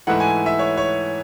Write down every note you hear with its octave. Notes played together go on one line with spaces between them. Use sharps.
G#2 E3 A3 E4 F#5
G#5
E5
C#5
C#5